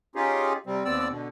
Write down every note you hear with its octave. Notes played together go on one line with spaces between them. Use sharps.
C#4 D#4 F4 G4 G#4
C3 G3 C4
D#2 B3 C4 D5 E6
B2 D3